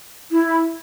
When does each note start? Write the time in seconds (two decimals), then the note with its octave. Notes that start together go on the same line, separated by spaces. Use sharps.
0.32 E4